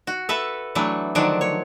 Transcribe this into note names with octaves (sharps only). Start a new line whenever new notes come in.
F#4
A4 B4 E5
E3 F#3 A3 D4
D3 D#3 F3 F#3 D4
C#5